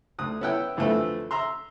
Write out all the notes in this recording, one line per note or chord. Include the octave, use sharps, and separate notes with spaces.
D2 D#6 F#6
B3 C#4 E4 F#5 G5
F2 D3 E3 F3 A3 E4
E5 A#5 C6